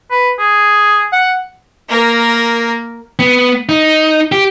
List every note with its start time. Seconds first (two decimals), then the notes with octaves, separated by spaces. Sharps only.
0.11 B4
0.39 G#4
1.13 F#5
1.89 A#3 A#4
3.19 B3
3.69 D#4
4.32 G4